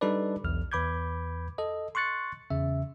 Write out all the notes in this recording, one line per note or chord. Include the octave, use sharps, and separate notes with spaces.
G3 D4 D#4 A4 B4 D5
B1 E2 F6
E2 B4 B5 D6 G6 G#6
A4 D#5
C6 C#6 F#6 A6 C#7
E2 C#3 E5